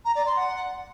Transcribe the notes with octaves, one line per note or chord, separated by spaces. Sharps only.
A#5
D5
C6
F#5